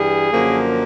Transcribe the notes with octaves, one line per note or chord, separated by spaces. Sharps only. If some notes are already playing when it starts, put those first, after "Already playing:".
Already playing: G2 E3 G3 G#4
F#2 D3 F3 A#3